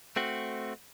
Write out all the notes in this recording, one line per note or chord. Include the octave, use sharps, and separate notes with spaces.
A3 C4 F#4